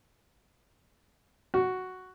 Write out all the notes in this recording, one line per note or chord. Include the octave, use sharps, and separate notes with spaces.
F#4